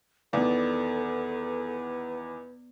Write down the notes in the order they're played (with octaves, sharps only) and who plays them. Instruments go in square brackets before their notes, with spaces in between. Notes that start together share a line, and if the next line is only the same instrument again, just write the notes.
[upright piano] E2 D#3 [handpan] B3 D5 [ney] A4 [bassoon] B4